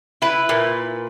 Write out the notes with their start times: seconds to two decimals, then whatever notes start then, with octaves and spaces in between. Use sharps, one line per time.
0.22 E4 B4
0.49 A#2